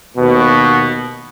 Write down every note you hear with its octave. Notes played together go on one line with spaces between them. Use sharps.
D#2 B2